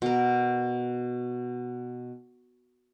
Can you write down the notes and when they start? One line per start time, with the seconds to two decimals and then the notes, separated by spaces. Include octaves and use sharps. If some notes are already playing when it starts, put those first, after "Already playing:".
0.02 B2 A#4